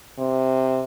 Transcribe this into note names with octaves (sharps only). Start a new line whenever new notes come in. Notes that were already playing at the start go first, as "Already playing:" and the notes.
C3